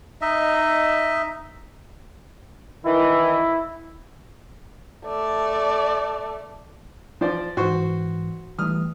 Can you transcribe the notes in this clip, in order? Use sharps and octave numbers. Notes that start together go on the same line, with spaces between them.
D#4 D#5 E5
D#3 E3 E4
A3 D5
F3 C5 D5
G#2 E3 F#4 C5 C#6
E3 G3 A3 D#6 F6